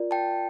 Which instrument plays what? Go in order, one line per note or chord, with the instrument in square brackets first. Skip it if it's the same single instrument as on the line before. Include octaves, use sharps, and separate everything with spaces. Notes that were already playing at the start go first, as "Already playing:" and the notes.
Already playing: [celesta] F4 A#4 D5
[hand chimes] G5 A5